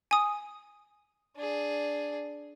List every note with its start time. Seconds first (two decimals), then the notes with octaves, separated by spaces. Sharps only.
0.11 G#5 D#6
1.36 D4 G#4